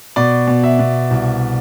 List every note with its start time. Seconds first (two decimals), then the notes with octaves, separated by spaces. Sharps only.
0.16 B2 D5
0.48 B2
0.64 E5
0.79 B2
1.11 C2